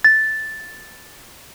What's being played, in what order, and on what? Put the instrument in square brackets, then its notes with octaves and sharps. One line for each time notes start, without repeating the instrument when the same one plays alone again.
[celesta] A6